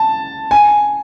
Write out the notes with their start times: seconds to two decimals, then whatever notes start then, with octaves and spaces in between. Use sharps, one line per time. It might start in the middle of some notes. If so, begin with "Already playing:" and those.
Already playing: A5
0.51 G#5